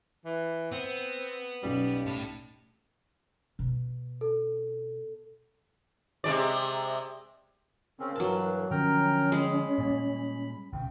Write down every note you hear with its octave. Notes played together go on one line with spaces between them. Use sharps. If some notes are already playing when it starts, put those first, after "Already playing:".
E3
B3 C4
B1 G3 C#4
A2 A5
B2
A4
C3 G#3 D5
C#3 C4 C#4 A#4
G2 E3 F#3 A5
D3 F3 C#4 A#4 G5 A#5
G#3 G#4 B5
A#2 G3
B1 C#3 G5